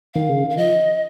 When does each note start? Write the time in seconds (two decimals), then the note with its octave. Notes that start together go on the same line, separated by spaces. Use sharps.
0.14 D#3 F5
0.29 C#3
0.44 D#3
0.50 F5
0.57 F3 D#5